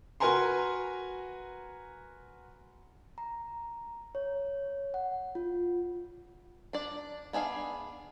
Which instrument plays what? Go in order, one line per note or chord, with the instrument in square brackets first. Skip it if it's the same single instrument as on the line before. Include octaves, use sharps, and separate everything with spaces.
[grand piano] F#4 A#4 B4 G#5 A#5 C6
[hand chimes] A#5
C#5
F#5
F4
[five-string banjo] D4 D5
B3 D4 G#4 E5 F5